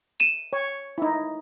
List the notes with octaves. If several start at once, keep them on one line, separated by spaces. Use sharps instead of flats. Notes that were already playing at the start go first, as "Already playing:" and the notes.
D#7 E7
C#5
D#4 E4